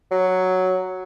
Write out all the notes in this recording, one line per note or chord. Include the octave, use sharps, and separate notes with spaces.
F#3